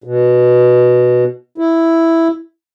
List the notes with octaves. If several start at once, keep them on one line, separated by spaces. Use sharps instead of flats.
B2
E4